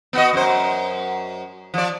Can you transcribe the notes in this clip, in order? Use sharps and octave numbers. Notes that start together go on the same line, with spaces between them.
B3 F#4 D#5
F#2 C5
F3 D5